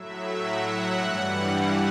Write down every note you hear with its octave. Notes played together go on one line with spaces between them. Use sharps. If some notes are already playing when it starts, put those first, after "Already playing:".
Already playing: A2 F#3 E5
F#5
G2 E3 G3